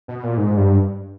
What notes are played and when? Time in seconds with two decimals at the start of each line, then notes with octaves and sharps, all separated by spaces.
0.08 B2
0.23 A#2
0.37 G#2
0.57 G2